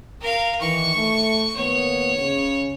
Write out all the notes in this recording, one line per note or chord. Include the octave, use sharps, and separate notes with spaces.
A#4 F5
D#3 E3 C#6
A3
D#2 A#3 B3 C#5
C#3